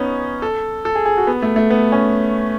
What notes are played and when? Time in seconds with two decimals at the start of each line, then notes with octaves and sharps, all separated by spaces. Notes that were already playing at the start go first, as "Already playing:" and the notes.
Already playing: B3 C#4 D#4
0.42 A4
0.85 A4
0.95 G#4
1.06 G#4
1.17 F#4
1.27 B3
1.42 A3
1.56 A3
1.70 B3
1.92 C#4